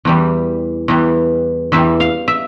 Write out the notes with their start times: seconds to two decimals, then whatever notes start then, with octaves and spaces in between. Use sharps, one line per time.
0.05 E2 E3 G3
0.88 E2 E3 G3
1.72 E2 E3 G3 E5
2.00 F5
2.28 E5